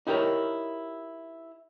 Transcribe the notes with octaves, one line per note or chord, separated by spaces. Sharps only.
D#4 E4 G4 A4 A#4 C#5